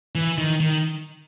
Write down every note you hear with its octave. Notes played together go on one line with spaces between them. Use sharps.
E3
D#3
D#3